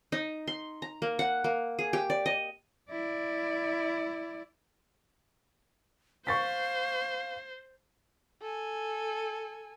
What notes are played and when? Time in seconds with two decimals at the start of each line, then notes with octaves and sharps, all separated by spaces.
0.12 D#4
0.48 C6
0.82 A#5
1.02 A#3
1.19 F#5
1.44 A#3
1.79 G#4
1.93 G4
2.10 D5
2.26 D#5
2.91 E4 D5
6.27 C5 F5 C#6 A6 B6
8.41 A4 G#5